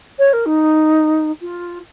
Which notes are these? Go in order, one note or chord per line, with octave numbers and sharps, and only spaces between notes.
C#5
A#4
D#4
F4